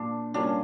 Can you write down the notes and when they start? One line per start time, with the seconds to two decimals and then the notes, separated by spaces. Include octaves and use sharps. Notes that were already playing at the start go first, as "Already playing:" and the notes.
Already playing: A#2 D4
0.34 G3 A#3 C#4 D4 F4